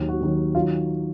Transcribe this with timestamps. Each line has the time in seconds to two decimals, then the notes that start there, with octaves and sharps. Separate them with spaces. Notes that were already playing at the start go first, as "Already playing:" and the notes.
Already playing: D#2 D#3 F#3
0.09 F#4
0.20 D#2 D#3 F#3
0.55 D#3 F#3 F4